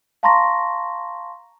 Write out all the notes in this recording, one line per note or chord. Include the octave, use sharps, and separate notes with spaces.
F5 A5 A#5 C6 C#6 A#6